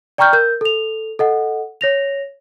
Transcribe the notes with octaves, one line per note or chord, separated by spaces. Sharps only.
D5 G5 A#5 C#6 F6 G6
A#4 G6
A4 F7
A4 D#5 F#5
C#5 A#6 F7